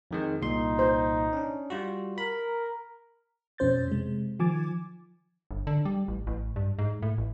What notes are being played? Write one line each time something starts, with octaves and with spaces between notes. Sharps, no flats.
F2 D#3 G#3
C2 A#2 D#4 C6
C5
C#4 D4
G3 F4 F#4
A#4 B5
F2 B2 C#4 C5 G6 A6
C3 G#3
D#3 F3 G#5 D6 G#6 A6
G1
D3
G3
A1
A1
G2
G#2
A2
A1